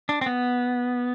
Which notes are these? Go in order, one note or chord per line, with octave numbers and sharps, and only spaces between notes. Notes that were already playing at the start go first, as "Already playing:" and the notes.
D4
C4
B3